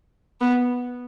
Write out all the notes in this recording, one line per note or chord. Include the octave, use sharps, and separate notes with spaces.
B3